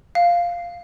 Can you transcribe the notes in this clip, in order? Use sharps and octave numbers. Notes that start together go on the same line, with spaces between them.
F5